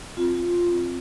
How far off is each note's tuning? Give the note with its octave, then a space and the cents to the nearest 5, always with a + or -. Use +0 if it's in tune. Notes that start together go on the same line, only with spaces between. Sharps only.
C4 +0 F4 +0